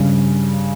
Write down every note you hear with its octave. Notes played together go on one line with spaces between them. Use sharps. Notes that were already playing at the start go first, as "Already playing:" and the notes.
Already playing: G2 C#3